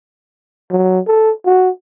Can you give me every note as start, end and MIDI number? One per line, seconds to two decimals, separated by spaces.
0.71 1.00 54
1.07 1.31 69
1.46 1.69 66